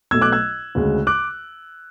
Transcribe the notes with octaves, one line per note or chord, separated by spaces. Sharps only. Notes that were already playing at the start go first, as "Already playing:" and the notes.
B1 B2 A3 E6 G#6
D6 F#6
E6 G#6
D2 C#3 G#3
D6 F#6